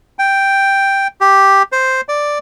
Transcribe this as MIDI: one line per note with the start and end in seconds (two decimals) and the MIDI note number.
0.19 1.07 79
1.21 1.63 67
1.72 2.01 72
2.09 2.38 74